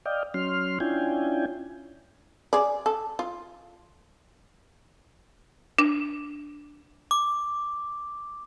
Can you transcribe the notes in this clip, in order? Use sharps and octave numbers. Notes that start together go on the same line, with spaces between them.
D5 D#5 F5 G5
F#3 C#4 C6 F6
C#4 D4 E4 F4 G5 G#5
G#4 D5
A4
F4
D4
D6